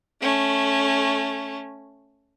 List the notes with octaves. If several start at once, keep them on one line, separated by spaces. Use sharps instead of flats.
A3 C#4